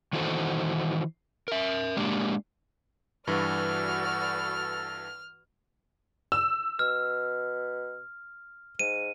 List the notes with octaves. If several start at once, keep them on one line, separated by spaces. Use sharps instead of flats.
D#3 E3 D#4 F#4 A4 C5
A#4 E5
G#3 A#3 D4 G4
G2 E3 F#4 A4 B4 D5 F6
E6
B2 F6
G#2 D#7